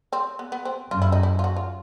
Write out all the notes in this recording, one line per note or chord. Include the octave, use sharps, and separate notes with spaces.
C4
B3
B3
C4
F#2 F4
E4
D#4
E4
F4
F#4
F4